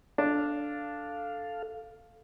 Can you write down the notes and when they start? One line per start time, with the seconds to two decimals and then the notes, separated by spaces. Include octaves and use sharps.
0.18 D4 A4 F5